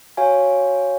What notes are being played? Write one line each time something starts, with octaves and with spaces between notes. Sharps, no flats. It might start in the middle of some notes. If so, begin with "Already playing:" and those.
F#4 C#5 F5 G#5